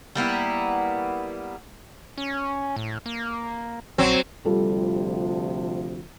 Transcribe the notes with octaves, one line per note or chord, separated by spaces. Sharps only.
G3 A#3 B3 E4
C#4
A2
A#3
A#1 F#3 C4
D2 C3 F3 G3 F4 A4